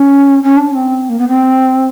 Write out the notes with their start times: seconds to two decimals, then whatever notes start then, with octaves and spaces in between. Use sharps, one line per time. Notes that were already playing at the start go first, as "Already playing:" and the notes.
Already playing: C#4
0.43 C#4
0.57 D4
0.71 C#4
0.75 C4
1.09 A#3
1.19 B3
1.28 C4